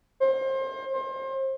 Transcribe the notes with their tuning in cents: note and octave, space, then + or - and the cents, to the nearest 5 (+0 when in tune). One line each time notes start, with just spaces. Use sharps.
C5 +30
C5 +30